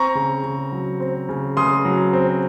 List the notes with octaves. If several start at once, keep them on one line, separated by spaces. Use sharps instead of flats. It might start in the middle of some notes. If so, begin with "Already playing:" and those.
Already playing: C4 A#5 C#6
C#3
C#3
F#3
C4
C#3
C#3 C6 D#6
F#3
C4